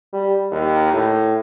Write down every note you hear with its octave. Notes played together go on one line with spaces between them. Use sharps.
G3
D#2
A2